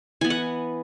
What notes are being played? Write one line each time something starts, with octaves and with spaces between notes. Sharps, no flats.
E3 B3 G#5
F#5